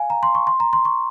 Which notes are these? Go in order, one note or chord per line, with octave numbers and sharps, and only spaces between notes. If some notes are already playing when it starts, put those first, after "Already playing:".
Already playing: F5 G#5
A#5
C6
C#6
C6
A#5
C6
C#6